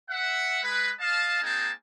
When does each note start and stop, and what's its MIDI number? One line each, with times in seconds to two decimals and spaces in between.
0.11 0.63 76
0.11 0.63 78
0.63 0.90 56
0.63 0.90 71
1.00 1.39 75
1.00 1.39 77
1.00 1.39 81
1.42 1.70 56
1.42 1.70 58
1.42 1.70 60
1.42 1.70 63
1.42 1.70 80
1.42 1.70 81